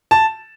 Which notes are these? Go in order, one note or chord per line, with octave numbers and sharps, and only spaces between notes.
A5